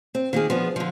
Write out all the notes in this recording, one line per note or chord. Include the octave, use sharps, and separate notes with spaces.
C4
D#3 A#3 F4 G#4
F3 B3 D4
D3 F3